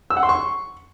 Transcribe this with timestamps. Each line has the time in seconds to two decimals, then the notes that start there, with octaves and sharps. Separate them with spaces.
0.10 E6
0.17 F#5
0.23 C6
0.29 C#6